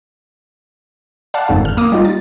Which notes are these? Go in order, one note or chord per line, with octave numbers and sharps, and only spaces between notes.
D5 F5 F#5 A5
G1 F2 G#2 D#3 A4
F6
A#3 D6 D#6
G3 D#4 F4
A6